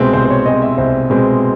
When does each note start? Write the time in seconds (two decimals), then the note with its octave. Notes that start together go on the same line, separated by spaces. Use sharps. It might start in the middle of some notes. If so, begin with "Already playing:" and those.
Already playing: C2 B2 G#3 C4
0.13 C2 C5
0.25 C5
0.31 C#5
0.46 B2 G#3 C4 D#5
0.62 E5
0.78 C2 C5
1.10 B2 G#3 C4